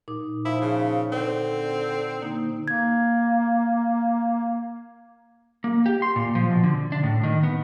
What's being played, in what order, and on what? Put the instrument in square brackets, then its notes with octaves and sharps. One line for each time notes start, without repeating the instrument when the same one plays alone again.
[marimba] A#2 D#4 D6
[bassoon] F3 [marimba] D#4 [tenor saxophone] E4
[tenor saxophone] C#3
[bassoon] D3 [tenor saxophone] C4
[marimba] D3 A#3 D#4
[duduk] A#3 [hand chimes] G#6
[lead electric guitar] A#3
G4
C6
A#2
F3
B2
D3
D4
A2
D#3
B3